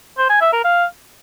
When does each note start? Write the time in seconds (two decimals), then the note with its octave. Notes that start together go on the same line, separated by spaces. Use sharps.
0.18 C5
0.30 G#5
0.41 E5
0.53 A#4
0.64 F5